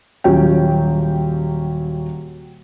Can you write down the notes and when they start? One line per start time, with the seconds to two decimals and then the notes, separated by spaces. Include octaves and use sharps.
0.24 D#1 F#3 C#4 G4 G5